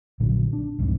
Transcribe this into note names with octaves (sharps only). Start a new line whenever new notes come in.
A#1 A#2 D3 F#3
D4
C2 F2 G#2 C3